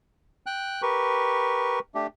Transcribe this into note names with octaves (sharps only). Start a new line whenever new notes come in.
G5 F#6
G4 A#4 B4 C#6
A3 D4 G4